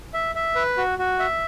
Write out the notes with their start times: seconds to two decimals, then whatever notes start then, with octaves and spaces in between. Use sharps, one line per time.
0.14 E5
0.35 E5
0.55 B4
0.78 F#4
0.99 F#4
1.19 E5